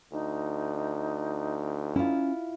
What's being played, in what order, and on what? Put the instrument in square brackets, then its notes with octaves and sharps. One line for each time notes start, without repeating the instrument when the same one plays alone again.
[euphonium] D2 [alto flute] D#4
[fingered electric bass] C#4 [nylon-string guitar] E4 F4